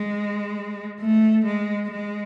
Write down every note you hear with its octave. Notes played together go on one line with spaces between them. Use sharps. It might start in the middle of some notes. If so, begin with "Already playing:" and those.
Already playing: G#3
A3
G#3
G#3